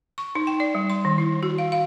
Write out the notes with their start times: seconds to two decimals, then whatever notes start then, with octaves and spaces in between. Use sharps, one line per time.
0.18 C#6
0.35 D#4
0.47 G5
0.60 D5
0.75 G3
0.90 C6
1.05 D#3
1.18 E4
1.43 F#4
1.58 F5
1.72 F5